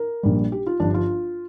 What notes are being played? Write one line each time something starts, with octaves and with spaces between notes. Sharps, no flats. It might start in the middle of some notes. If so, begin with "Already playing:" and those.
Already playing: A#4
A#1 A#2 G3
G4
F4
G1 G2 F3 D4
F4